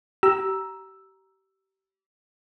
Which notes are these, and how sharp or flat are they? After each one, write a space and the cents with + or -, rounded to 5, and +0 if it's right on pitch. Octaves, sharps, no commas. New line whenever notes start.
G4 -30 A#5 +10 E6 +0